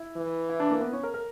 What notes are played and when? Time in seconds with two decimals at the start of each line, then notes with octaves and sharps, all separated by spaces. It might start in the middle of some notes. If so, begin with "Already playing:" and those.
Already playing: E4
0.16 E3
0.49 E4
0.60 D4
0.71 A#3
0.81 B3
0.93 C#4
1.03 A#4
1.14 A#4